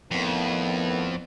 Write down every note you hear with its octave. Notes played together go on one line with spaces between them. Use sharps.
F2 A2 D#3 B3